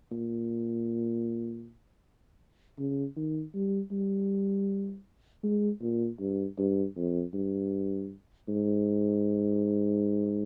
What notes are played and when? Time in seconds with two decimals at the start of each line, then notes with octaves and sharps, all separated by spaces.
0.12 A#2
2.78 C#3
3.16 D#3
3.54 G3
3.91 G3
5.43 G#3
5.81 A#2
6.19 G2
6.58 G2
6.96 F2
7.33 G2
8.48 G#2